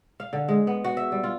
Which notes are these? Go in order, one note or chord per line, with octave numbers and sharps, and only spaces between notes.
F5
D3
G#3
B3
F#4
E5
G3
F4